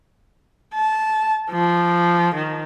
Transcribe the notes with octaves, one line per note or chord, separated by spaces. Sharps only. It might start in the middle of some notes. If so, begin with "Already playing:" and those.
A5
F3
D#3